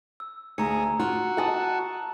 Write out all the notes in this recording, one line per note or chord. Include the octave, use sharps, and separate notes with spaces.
E6
D2 G#4 A#5 E6 C#7
F4 F#4
F#5 A5 D#6